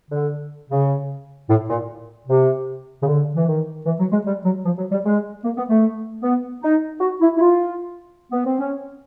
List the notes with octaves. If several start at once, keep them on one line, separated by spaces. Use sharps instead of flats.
D3
C#3
A2
A#2
C3
C#3
D3
E3
D#3
E3
F#3
G#3
G3
F#3
F3
F#3
G3
G#3
A#3
B3
A3
B3
D#4
F#4
E4
E4
F4
B3
C4
C#4